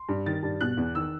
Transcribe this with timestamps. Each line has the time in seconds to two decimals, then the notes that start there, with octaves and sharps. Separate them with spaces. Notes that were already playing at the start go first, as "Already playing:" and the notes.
Already playing: C6
0.09 G2
0.26 D#3 A6
0.43 G2
0.61 B2 F#6
0.77 E2
0.95 D#3 E6